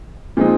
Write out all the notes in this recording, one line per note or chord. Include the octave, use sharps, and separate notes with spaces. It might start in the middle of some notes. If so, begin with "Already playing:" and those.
A#2 F3 G#3 C4 D#4